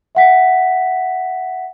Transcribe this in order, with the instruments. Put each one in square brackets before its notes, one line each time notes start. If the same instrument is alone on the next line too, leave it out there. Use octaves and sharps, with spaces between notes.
[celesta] E5 F#5 B6